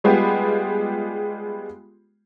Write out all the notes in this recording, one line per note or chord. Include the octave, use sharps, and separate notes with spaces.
G3 G#3 B3 F4 G4